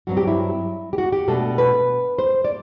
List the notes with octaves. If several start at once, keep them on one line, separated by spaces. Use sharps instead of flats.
G2 F#3 C4 F#4
G4
E4
G4
F#4
G4
B2 A3 D4 A4
B4
C5
D5